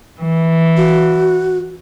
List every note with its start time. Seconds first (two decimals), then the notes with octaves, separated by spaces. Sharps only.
0.21 E3
0.77 F#4